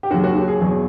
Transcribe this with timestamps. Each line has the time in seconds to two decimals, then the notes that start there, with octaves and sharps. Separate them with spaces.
0.03 G4
0.11 D#2 C#3 F#3 F#4
0.24 F#4
0.36 G4
0.48 G#4
0.61 E2 B2 F#3